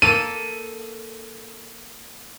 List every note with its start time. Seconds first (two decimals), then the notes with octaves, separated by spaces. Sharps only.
0.02 A#3 A4 D#7